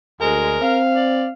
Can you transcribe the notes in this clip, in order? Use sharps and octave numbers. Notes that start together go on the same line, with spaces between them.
D2 G#3 A#4
C4 F5
D5